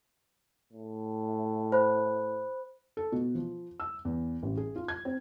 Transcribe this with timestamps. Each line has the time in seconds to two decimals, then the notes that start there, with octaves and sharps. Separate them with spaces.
0.73 A2
1.72 C5 B5 F#6
2.97 A4
3.12 B2
3.35 F3
3.80 E6
4.05 E2
4.43 A1
4.57 G#4
4.76 F4
4.88 G#6
5.05 C4